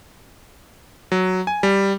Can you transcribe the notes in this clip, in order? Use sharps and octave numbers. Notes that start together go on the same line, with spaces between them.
F#3
G#5
G3